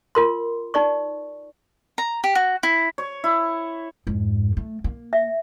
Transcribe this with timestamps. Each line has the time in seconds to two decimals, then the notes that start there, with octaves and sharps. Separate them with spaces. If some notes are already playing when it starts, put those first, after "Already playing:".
0.15 F4 A#4 C6
0.74 D#4 D5 C#6
1.98 A#5
2.24 G4
2.35 F#4
2.63 E4
2.98 C#5
3.24 E4
4.07 F2 G#2
4.57 A3
4.84 A#3
5.13 E5